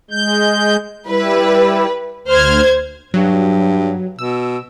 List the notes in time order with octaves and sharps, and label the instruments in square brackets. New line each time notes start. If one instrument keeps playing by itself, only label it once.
[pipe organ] G#3 G6
[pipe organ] G3 E4 [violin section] B4
[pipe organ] D2 F6 [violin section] C5 G#6
[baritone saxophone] G2 [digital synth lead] F#3
[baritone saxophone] B2 [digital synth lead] E6